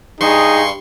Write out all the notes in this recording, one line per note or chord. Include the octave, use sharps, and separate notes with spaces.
G2 D#4 G#4 C6 C#6